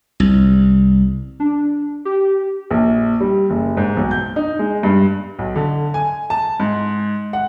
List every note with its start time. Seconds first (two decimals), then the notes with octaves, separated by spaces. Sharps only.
0.20 C2
1.40 D4
2.05 G4
2.71 A#1
3.21 G3
3.50 F#1
3.77 G#2
3.97 B1
4.11 G6
4.36 D#4
4.59 G#3
4.83 G2
5.39 B1
5.55 D3
5.94 G#5
6.30 A5
6.60 G#2
7.33 F#5